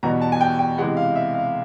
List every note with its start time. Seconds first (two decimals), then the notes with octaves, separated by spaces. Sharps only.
0.03 E2 B2 G3 B3 A#5
0.21 A5
0.32 G#5
0.41 G5
0.59 G5
0.78 C3 E3 G#3 B3 F#5
0.97 F5
1.16 E5
1.34 F5